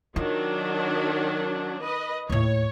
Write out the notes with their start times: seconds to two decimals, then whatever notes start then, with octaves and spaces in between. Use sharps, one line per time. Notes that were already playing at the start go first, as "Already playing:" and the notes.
0.16 D#3 F#3 D4 F4
1.82 B4 D#5
2.30 D#2 A2 C#5